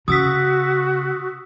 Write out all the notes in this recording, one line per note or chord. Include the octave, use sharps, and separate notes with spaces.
C#3 F#4 D#6 E6 B6